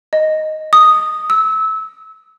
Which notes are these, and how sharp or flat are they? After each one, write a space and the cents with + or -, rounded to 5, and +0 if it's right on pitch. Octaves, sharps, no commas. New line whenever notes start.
D#5 +0
D#6 -5
E6 -25